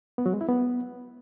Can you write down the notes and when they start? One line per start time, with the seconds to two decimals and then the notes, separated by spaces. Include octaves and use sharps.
0.18 B3
0.26 F#3
0.33 G#3
0.41 E4
0.48 B3